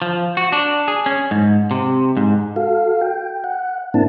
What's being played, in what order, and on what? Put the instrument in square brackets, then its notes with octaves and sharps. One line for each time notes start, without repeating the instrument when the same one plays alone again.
[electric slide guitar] F3
F#4
D4
G#4
C#4
G#2
C3
G#2
[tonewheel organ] F#4 A4 F5
G5
F#5
A2 A#3 C4 D4 E4 A5